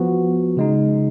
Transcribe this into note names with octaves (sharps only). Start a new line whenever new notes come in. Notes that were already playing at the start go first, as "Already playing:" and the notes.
Already playing: F3 B3 F#4
C#3 G#3 D#4